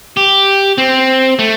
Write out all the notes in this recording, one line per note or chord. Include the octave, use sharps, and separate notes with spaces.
G4
C4
A3